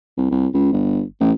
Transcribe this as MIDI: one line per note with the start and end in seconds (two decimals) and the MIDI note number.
0.18 0.27 36
0.31 0.47 36
0.54 0.72 37
0.72 1.02 31
1.20 1.32 33